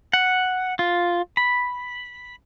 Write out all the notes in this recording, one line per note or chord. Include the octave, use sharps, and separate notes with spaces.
F#5
F4
B5